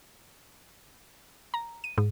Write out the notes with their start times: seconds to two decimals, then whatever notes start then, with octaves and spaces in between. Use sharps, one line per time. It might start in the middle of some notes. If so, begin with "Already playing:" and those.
1.54 A#5
1.84 D#7
1.98 G#2